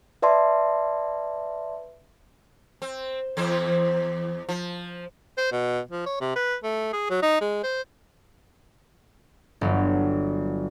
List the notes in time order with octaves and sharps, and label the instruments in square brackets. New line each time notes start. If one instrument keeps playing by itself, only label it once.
[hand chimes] B4 D5 E5 A5 C6
[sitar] C4
E2 C4 C5
F3
[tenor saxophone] C5
B2
F3
C#5
C3
B4
A3
G#4
F#3
D#4
G#3
C5
[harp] G1 F#3